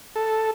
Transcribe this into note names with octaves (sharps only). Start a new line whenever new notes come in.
A4